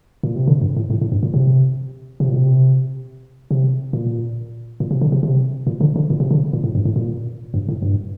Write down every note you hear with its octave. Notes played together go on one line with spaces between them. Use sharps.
A#2
C3
D3
G2
A2
A2
A2
G2
A#2
C3
C3
A#2
C3
C3
A#2
A#2
C3
D3
C3
C3
A#2
D3
D3
A#2
C3
D3
A#2
A2
G2
A2
A#2
G2
A2
G2